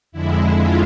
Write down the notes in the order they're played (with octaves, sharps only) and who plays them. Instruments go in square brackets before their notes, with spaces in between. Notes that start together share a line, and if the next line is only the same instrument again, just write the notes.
[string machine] F2 D3 G#3 E4
F4